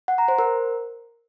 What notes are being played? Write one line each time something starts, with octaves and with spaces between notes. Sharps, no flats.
F#5
A#5
C5
A#4